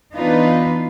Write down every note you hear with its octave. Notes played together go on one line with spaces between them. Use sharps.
E3 B3 D4 D#4 F4 B4